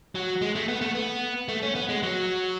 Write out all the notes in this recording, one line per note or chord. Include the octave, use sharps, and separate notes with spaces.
F#3
G#3
A3
B3
A3
B3
A3
C#4
B3
G#3
F#3